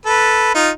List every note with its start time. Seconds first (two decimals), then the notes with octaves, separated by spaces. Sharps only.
0.06 A4 B4
0.55 D#4 F4